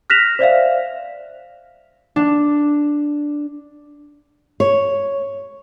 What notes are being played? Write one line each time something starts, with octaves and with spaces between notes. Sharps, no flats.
F6 F#6 A#6 B6 E7 F7
C5 D5 E5 F5
D4
C#5